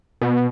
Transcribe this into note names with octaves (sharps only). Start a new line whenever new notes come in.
B2